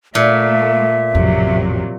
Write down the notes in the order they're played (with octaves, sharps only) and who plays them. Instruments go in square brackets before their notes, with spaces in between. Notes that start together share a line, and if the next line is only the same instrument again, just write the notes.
[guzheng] A#2 [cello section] A3 A#3 [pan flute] E5
[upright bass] A1 F2 [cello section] C3 F#3